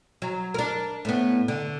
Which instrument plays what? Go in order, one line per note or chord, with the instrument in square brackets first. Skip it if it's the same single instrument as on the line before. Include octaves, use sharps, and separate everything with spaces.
[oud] F#3
D4 A#4
A2 B3
D3